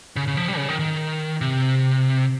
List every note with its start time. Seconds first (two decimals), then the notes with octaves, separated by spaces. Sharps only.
0.16 C#3
0.27 C#3
0.37 F3
0.48 G3
0.57 C#3
0.69 D#3
0.79 D#3
1.41 C3